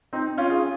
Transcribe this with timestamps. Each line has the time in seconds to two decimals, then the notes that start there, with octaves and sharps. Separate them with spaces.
0.13 C4 D#4
0.37 C#4 F4
0.49 F4 G#4